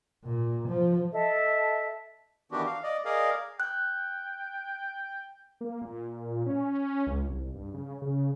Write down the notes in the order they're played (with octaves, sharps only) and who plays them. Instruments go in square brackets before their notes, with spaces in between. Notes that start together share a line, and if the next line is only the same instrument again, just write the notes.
[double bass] A#2
F3
[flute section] A4 D#5 E5
[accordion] D#3 E3 B3 D4 F#4 G4
F5
D5 D#5
G#4 A#4 D5 D#5 F5
[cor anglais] G5 [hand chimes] F#6
[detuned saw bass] A#3
A#2
C#4
C#2
C2
G2
C#3
C#3